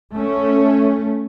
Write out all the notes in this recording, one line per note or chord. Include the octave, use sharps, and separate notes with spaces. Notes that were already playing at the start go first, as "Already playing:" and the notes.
A3 C#4